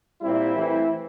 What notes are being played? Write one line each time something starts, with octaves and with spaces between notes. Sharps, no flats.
A#2 G3 C4 E4
E3 A3 C4